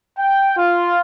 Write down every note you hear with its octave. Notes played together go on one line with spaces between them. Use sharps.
G5
F4